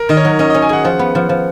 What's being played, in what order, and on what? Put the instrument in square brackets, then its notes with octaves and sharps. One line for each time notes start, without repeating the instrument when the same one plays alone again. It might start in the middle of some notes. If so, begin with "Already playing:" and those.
Already playing: [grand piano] A#4
[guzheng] D#3 [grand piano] D#5
[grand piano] C#5
[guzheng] F#3
[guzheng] C#4 [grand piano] D#5
[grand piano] D#5
[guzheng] C#4
[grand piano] G#5
[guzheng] G#4 [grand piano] F#5
[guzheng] F3 [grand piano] F#5
[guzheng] B3
F3
F3